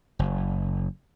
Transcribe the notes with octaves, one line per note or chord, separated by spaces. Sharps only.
F#1